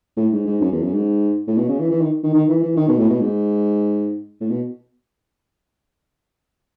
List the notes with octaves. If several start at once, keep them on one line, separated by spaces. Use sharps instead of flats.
A2
G#2
G#2
F#2
E2
F#2
G#2
A2
B2
C#3
E3
E3
D#3
D#3
D#3
E3
E3
D#3
B2
A2
B2
G#2
A2
B2